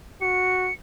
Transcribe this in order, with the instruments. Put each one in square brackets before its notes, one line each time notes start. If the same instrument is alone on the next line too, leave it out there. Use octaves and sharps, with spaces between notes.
[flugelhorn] F#4 [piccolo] C#7